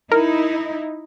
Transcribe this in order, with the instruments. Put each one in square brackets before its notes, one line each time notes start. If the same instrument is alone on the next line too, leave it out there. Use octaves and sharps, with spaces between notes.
[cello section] D#4 E4 [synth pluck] A#4